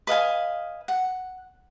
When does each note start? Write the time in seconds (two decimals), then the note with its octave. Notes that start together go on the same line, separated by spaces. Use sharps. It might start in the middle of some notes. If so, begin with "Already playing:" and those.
0.07 B4 D#5 F5 G#5
0.88 F#5